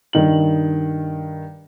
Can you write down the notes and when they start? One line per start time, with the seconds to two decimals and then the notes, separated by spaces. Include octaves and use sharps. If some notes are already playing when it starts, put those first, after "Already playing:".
0.13 G2 D#3 F#7